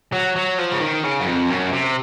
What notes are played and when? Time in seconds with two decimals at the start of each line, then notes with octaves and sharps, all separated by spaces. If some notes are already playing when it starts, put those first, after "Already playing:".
0.13 F#3
0.36 F#3
0.58 F3
0.72 C#3
0.80 D#3
1.04 C#3
1.21 F#2
1.27 F2
1.49 F#2
1.72 C3